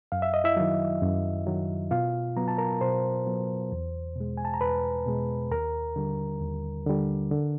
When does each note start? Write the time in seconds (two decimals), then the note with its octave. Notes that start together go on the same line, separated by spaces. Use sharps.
0.12 F#2 F5
0.22 E5
0.34 D#5
0.44 E4 E5
0.57 D#3 F#3
1.02 F#2
1.47 D#3 F#3
1.91 B2 F4 F5
2.36 F#3 B3 A#5
2.48 A5
2.58 A#4 A#5
2.81 B2 C5 C6
3.26 F#3 B3
3.72 E2
4.16 B2 G#3
4.37 G#5
4.45 A5
4.54 A#5
4.61 E2 B4 B5
5.06 B2 G#3
5.51 D#2 A#4 A#5
5.96 D3 G3
6.41 D#2
6.86 D3 G3
7.31 D3